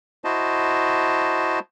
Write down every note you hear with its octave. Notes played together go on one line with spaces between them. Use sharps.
E4 F#4 C5 D#5 A5